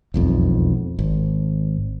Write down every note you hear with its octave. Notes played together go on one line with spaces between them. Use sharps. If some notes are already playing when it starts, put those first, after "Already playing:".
E1 B1 F2
G#1